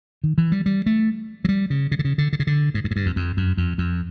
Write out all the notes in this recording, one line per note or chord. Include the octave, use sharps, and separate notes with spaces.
D#3
E3
G3
G3
A3
F#3
G3
C#3
C#3
D3
C#3
D3
D3
C#3
D3
G#2
G2
G#2
G2
F2
F2
F#2
F2
F2